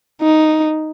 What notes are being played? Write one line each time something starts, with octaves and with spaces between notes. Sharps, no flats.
D#4